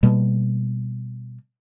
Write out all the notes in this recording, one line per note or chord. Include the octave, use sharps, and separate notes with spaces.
B2 G3 A#3